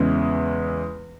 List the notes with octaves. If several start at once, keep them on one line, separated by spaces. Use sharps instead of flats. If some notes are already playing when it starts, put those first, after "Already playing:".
Already playing: E2 C#3 E3 G#3